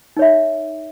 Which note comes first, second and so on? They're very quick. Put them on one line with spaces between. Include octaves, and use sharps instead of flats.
D#4 C#5 E5